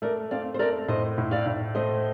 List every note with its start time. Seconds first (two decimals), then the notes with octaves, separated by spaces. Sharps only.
0.02 A3 A#4 D5
0.31 C4 D5 F5
0.54 C5
0.59 A3 A#4 D5
0.88 A2 C5 D#5
1.18 A2
1.31 D5 F5
1.46 A2
1.75 A3 C5 D#5